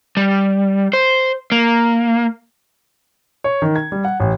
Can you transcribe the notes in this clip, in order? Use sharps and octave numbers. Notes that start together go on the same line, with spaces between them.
G3
C5
A#3
C#5
D#3
G#6
G3
F#5
A1